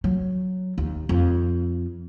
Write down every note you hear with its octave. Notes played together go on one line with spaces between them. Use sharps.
F#3
D#2
F2